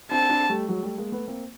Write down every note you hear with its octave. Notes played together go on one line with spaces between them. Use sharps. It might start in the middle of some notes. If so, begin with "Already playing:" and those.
C4 D4 A5
C4 D4
G3 A3
F#3 G#3
G3 A3
G#3 A#3
A3 B3
A#3 C4